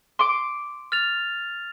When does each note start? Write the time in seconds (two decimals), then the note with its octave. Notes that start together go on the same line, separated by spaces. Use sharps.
0.19 C6 D6
0.92 F6 A6 F7